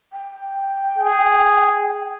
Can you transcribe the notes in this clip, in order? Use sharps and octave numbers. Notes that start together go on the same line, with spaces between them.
G5
G#4